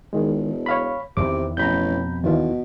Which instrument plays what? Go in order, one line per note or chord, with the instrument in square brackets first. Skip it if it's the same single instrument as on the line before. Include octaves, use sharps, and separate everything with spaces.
[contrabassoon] E1 [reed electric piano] D#3 G#3
[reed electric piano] C#5 F5 B5
[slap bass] E2 D#3 E3 [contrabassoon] C3 [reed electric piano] D6
[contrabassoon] A1 [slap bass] F2 B2 [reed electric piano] A#5 B5 G6
[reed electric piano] D#2 E3 F4 [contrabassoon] B2